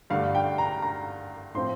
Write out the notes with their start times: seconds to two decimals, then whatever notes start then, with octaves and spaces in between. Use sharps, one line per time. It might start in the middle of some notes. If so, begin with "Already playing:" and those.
0.10 G2 D3 A3 D4 F5
0.35 G5
0.58 A#5
0.82 A#5
1.54 A2 F3 C4 C6